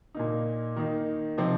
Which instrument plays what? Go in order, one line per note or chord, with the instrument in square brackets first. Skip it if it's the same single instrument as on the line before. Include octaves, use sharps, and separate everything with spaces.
[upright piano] A#2 A#3 D#4
D#3 A#3 D#4
C3 F3 C4 D#4